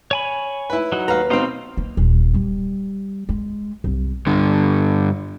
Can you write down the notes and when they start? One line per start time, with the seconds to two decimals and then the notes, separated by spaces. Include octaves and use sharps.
0.11 C#5 G#5 B5
0.70 E4 B4
0.92 F#3 D#4 F#4
1.08 D#2 B4 F5 A#5
1.30 B2 C4 D#4 C5 F5
1.77 A#3
1.97 D#1
2.34 G3
3.29 G#3
3.84 C2
4.27 G2 D3